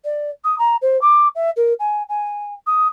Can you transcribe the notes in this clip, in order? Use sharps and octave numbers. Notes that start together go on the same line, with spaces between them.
D5
D#6
A#5
C5
D6
E5
A#4
G#5
G#5
D#6